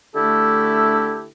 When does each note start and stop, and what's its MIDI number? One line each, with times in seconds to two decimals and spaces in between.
0.16 1.27 50
0.16 1.27 57
0.16 1.27 62
0.16 1.27 64
0.16 1.27 67
0.16 1.27 69